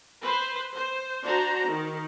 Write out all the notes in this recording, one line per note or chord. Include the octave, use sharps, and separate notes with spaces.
B4 C5
C5
D4 F#4 C5 A#5
D#3